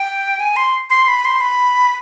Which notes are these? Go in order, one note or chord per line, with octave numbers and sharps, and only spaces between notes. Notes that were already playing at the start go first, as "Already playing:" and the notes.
Already playing: G5
G#5
C6
C6
B5
C6
B5